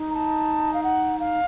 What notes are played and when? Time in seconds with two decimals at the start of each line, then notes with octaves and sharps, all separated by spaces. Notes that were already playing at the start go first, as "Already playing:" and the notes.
Already playing: D#4
0.11 A#5
0.15 A5
0.74 F5
0.84 F#5
1.20 F5